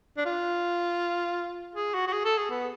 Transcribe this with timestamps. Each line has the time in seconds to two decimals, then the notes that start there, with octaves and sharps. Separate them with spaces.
0.17 D4
0.25 F4
1.75 G#4
1.94 F#4
2.07 F#4
2.13 G#4
2.25 A4
2.37 G#4
2.50 B3